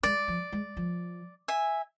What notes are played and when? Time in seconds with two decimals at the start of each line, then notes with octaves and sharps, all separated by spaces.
0.03 G#3 D5
0.28 F3
0.52 G#3
0.77 F3
1.48 E5 G#5